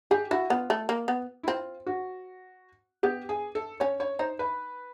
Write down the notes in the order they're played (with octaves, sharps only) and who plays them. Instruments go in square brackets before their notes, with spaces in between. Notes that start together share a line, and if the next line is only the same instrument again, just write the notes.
[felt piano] G4 [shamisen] G#4
[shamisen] E4 [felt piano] F#4
[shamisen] B3 [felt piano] F4
[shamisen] A3
A#3
B3
[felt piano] E4
[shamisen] C4 [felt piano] F4
[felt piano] F#4
[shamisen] B3 [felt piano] G4
[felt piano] G#4
A4
[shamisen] C#4 [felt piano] C#5
[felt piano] C#5
[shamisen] D#4 [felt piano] C5
[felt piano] B4